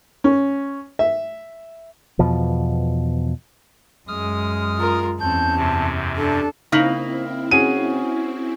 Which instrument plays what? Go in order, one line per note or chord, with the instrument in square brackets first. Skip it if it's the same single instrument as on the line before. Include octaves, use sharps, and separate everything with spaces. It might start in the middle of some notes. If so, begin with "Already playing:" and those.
[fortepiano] C#4
E5
[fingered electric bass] E2 B2 F3
[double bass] F#2 G#3 [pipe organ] D#6 F6
[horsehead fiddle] F4 A#4
[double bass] E2 [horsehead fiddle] C4 C#4 [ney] A5 [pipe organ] G6
[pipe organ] F#2 C3
[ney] D4 [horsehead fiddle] A4
[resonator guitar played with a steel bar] C#3 A#3 D#4 [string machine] C4 E4 [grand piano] F6 B6 F#7
[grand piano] C#4 F#4 G#4 [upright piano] D#7